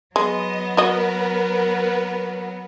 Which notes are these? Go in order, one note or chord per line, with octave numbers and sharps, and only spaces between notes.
F#3 G#3 B3 D#5
F#4 A#4 B4 D#5